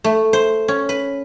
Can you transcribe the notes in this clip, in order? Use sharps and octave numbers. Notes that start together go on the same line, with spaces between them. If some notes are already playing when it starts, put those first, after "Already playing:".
A3
C5
C#4
B4